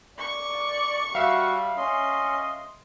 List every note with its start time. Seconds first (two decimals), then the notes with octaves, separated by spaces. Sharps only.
0.18 D5 C#6
1.15 G3 F#4 E5 F5
1.77 C#4 D#5 C6